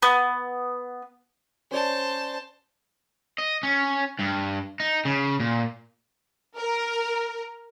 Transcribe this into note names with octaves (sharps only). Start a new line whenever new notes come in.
B3
C#4 C5 D5 A5
D#5
C#4
G2
D#4
C#3
A#2
A#4